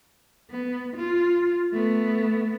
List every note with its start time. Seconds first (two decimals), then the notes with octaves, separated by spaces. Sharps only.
0.51 B3
0.96 F4
1.72 A3 B3